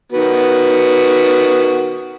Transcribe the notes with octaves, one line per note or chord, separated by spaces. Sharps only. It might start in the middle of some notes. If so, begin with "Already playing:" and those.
D#3 B3 F#4